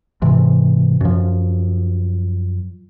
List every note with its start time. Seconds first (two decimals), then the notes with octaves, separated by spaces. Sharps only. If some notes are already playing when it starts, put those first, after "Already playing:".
0.22 G#2 C3 E3
1.01 F#2 F3